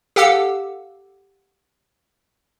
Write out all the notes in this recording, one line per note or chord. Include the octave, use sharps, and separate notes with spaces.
G4 A4 F5 F#5 D6 E6